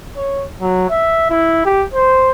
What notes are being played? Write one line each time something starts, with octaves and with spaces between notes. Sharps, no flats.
C#5
F#3
E5
E4
G4
C5